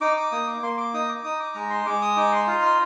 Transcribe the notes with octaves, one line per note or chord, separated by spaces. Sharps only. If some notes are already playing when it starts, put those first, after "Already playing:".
D#4 D6
D6
A#3 D#6
D6
A#3 C6
D6
D#4 D#6
D6
D#4 D#6
D6
G#3 A#5
C6
G#3 D6
D#6
D#4 D6
C6
F4 F5
C6